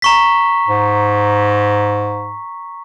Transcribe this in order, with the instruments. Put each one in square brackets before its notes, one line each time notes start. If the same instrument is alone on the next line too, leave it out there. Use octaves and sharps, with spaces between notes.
[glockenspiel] A#5 C#6 B6
[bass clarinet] G#2